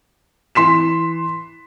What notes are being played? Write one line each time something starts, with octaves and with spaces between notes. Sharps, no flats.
E3 C6 B6 E7